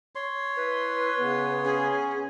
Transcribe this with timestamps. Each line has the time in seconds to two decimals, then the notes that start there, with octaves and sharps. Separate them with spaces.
0.15 C#5 C6
0.57 E4 B4
1.18 C#3 B3
1.64 C#4 G#4